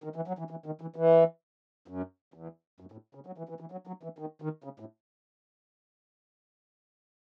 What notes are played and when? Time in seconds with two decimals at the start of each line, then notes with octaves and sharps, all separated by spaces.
0.04 D#3
0.16 E3
0.28 F#3
0.39 E3
0.51 E3
0.66 D#3
0.81 E3
0.96 E3
1.88 F#2
2.34 E2
2.80 F#2
2.92 A2
3.15 C#3
3.26 F#3
3.38 E3
3.49 E3
3.60 E3
3.72 F#3
3.87 F#3
4.03 E3
4.18 D#3
4.42 D#3
4.64 C#3
4.80 A2